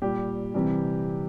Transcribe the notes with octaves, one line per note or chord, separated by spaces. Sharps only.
A#2 G3 G4
C3 E3 G3